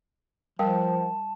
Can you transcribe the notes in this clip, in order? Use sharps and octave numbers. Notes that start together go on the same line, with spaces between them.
F3 G3 A#4 F5 G5 A5